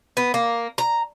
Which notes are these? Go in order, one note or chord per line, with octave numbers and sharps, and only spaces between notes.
B3
A#3
A#5